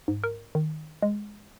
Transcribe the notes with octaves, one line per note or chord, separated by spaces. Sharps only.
G#2
A#4
D#3
G#3